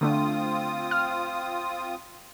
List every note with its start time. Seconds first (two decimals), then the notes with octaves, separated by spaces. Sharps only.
0.01 D3 A3 C4 D4 F4 D#6
0.91 F6